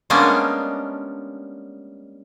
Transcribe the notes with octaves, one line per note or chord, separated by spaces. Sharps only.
G3 G#3 A#3 B3 C#4 D4